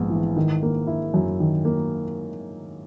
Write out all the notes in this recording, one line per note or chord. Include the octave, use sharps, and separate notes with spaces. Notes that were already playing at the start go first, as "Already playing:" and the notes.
Already playing: A#1 G#2 B3
E3
D#3
A#3
E4
F#2
D#3
A#3